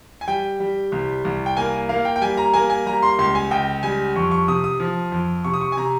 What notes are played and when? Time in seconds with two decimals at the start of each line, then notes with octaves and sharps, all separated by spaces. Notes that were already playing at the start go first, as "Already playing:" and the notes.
0.21 G#5
0.28 G3 G5
0.60 G3
0.92 C2
1.25 C2
1.46 G5
1.57 A#3 G#5
1.89 A#3 F5
2.05 G5
2.16 G5
2.21 G3 G#5
2.37 A#5
2.54 A#3 G#5
2.70 G#5
2.86 G3 A#5
3.03 C6
3.18 C#2 C6
3.35 G#5
3.51 C#2 G5
3.83 G3 G#5
4.16 F2 C#6
4.31 C#6
4.48 C3 D#6
4.64 D#6
4.80 F3
5.12 F2
5.44 C3 C#6
5.54 D#6
5.61 C#6
5.72 G#5
5.77 C3 A#5